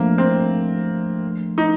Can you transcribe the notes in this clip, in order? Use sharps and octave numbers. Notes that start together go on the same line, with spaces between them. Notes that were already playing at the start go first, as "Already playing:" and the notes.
Already playing: F3 A3 A#3 D4
C4
D#4